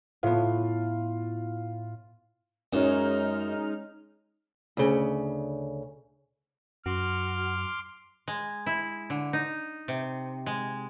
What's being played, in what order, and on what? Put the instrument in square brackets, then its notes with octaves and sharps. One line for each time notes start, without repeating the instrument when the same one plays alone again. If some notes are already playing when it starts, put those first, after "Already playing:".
[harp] A2 B3 [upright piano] F4
[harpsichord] F#2 [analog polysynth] G#3 D#4 F6 [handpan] C#4 C#5
[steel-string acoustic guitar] D2 C#3
[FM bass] F#2 [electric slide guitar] F#4 [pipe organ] C6 D6 [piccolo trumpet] F6
[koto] G#3
E4
D3
D#4
C3
G#3